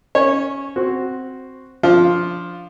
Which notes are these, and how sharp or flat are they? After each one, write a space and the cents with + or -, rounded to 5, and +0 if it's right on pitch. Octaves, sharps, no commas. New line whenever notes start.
C#4 +0 C#5 -20
C4 +0 F#4 +0
F3 +0 D4 -15 F4 +5